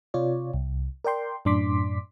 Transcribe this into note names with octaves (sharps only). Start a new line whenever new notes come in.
C3 F4 C#5 D5
C2
A#4 D5 G5 C6
F#2 A2 D4 C6 D6 B6